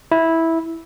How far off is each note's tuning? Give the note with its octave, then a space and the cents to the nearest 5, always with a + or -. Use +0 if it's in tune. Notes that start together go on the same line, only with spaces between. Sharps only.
E4 -10